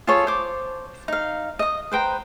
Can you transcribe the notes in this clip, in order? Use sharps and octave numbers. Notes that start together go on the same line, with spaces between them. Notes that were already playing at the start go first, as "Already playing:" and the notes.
F4 G#4 A4 C#5
C5 D6
D#4 F5
D#5 D#6
B4 C5 G5 A#5